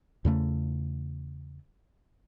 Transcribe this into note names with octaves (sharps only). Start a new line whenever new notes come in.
E2 C#3 A3